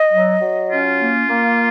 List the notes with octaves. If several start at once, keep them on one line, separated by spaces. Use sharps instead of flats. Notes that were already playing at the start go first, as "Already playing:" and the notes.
Already playing: D#5
F#3
F#3
C#4 F4
A#3
A#3